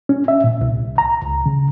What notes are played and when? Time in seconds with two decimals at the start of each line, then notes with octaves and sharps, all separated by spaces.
0.09 C#4
0.28 E5
0.44 A#2
0.61 C2
0.98 A#5
1.22 C#2
1.46 C#3